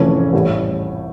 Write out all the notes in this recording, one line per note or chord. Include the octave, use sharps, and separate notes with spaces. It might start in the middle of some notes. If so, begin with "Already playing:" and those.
Already playing: F1 F2 E3 A3 C#4
A1 A2 G3